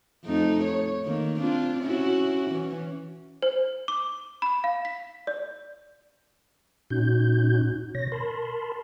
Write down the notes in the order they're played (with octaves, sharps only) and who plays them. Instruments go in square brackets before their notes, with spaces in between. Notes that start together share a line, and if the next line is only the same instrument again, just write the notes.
[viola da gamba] F2 A3 D#4
C#5
D#3 A#3
C4 D4 F4
C#4 E4 F#4
E3 C#4
[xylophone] C5
D6
B5
F5
B6
D5
[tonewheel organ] A#2 C#4 D#4 F#4 G6
B2 C#5 A#6
A#4 A5 B5 C6